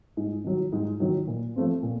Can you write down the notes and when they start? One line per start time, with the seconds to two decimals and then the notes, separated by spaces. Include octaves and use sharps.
0.17 G#2
0.44 D#3 F#3
0.72 G#2
1.00 D#3 F#3
1.27 A#2
1.56 F3 A3 C4
1.83 A#2